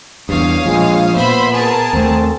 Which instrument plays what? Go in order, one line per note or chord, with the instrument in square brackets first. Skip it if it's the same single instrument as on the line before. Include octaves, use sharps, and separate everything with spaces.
[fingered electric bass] E2 G2 [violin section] C#5 F5 D#6
[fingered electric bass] A#2 F3 [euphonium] G#3
[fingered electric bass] A#2 [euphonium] B3 [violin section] C5 E5 B5
[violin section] G#4 A#4 A5
[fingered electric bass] D#2 A3 [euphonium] C4